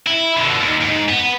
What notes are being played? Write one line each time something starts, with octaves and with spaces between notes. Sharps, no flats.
E4
B2 D3
D#2
G#2
B3